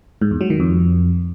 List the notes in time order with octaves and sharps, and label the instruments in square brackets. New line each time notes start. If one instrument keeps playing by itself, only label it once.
[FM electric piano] G#2
E2
F#3
D#3
F2